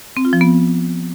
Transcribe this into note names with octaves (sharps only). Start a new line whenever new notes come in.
C4
F4
F3
B3